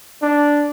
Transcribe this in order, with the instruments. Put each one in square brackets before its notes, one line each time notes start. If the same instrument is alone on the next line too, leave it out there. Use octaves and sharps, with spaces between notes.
[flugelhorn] D4